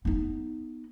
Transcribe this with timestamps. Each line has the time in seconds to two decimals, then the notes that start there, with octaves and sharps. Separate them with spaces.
0.05 B3 D#4